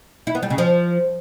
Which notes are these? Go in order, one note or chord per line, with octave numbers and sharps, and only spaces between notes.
E4
B3
G3
C#3
F3